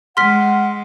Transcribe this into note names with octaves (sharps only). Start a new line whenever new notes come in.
G#3 F#5 C6 F6 B6